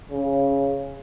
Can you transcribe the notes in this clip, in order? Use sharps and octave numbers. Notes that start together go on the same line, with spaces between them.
C#3